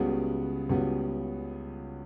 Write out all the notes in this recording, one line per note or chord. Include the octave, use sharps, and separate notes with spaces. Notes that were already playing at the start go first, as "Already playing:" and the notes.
Already playing: C#2 C#3 G3 B3 F#4
C#2 C#3 G3 B3 F#4